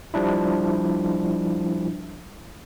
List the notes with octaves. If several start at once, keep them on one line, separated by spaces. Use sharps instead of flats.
F3 G3 D4 E4